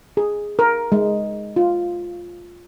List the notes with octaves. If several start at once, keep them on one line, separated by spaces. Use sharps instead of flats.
G#4
A#4
G#3
F4